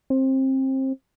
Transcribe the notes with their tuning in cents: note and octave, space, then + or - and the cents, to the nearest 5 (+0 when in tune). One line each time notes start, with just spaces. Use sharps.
C4 +25